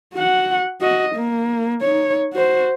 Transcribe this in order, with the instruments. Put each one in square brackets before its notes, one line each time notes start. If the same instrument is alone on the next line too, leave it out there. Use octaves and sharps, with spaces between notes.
[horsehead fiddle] F#4 F#5
F#4 D#5
A#3
D#4 C#5
F#4 C5